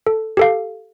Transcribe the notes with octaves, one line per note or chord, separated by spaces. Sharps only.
A4
G4 A4 F5